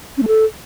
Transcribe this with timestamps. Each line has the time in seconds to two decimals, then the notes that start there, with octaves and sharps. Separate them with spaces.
0.17 C#4
0.22 A3
0.27 A4